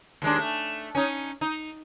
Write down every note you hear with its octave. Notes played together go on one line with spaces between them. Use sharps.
D#2 G#3 D4
A3
C#4 D#4
D#4